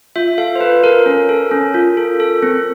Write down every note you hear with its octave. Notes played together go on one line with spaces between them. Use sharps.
F4 E5
E5
A4 F5
C5
F4 B4
A4 A#4
C#4
A4
C#4
F4
A4
A4
C4